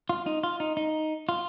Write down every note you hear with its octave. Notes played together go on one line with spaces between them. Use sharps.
F4
D#4
F4
D#4
D#4
F4